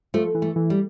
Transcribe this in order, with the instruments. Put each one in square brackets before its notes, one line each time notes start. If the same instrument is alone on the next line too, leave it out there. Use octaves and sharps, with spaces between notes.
[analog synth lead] F3 [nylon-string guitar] A3
[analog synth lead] E3
[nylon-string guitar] A3
[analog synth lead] E3
[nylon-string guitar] G3